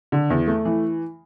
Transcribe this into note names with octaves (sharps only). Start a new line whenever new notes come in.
D3
E2
A3
E3